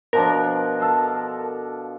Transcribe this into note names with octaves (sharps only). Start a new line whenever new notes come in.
B2 F3 D4 A#4
A4 F5 A5